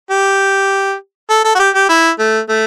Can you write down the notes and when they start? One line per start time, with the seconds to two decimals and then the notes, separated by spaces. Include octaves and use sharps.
0.11 G4
1.30 A4
1.44 A4
1.55 F#4
1.59 G4
1.75 G4
1.89 E4
2.19 A3
2.49 A3